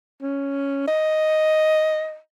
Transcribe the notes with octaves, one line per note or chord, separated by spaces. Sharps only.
C#4
D#5